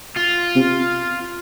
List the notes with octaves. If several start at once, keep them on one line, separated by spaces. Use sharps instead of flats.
F4
C3